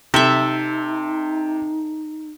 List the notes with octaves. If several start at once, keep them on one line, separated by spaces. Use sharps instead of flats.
C3 D#4 A4 E5